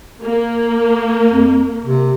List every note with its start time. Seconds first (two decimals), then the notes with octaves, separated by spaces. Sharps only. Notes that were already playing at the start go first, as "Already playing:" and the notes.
0.24 A#3
1.29 F2
1.85 C3